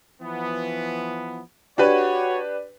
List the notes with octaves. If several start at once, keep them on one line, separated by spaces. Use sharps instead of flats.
E3 F3 B3
D4 F#4 G4 B4 C#5